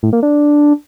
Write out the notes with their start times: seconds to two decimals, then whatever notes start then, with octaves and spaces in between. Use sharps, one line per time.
0.03 A2
0.13 A#3
0.23 D4